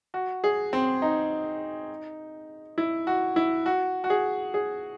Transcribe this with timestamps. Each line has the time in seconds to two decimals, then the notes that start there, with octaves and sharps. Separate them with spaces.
0.14 F#4
0.44 G#4
0.73 C4
1.02 D#4
2.78 E4
3.07 F#4
3.36 E4
3.66 F#4
4.04 F#4
4.10 G#4
4.54 G#4